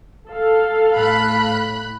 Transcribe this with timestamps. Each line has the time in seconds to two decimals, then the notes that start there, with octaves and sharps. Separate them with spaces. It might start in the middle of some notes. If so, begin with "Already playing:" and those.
0.30 A4 F5
0.96 A2 B5 F#6